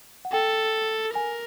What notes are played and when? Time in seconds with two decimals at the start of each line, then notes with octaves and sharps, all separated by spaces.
0.25 F#5
0.32 A4 G5
1.15 A#4 G#5